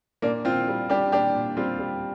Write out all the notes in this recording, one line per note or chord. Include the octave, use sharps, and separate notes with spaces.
A#2 A#3 D4
A#2 C4 F4
G3
G3 D4 G4
A#2 D4 G4
A#2
G3 C4 F4
G3